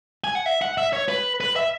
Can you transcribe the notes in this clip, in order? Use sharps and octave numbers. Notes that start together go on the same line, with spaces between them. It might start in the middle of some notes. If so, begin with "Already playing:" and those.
G#5
F#5
E5
F#5
E5
C#5
B4
B4
E5